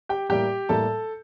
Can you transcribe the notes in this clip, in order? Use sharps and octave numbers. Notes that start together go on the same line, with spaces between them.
G4 G5
A2 G3 A#3 G4 G5
A2 G3 A#3 A4 A5